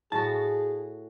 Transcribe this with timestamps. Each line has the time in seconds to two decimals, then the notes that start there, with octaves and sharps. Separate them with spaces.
0.12 A2 F#4 G#4 A5